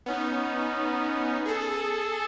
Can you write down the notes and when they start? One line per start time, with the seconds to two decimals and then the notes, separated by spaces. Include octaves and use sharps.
0.06 B3 C#4 D#4
1.46 G#4 A4